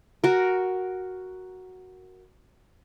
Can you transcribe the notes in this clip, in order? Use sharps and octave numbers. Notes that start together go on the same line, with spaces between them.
F#4 A#4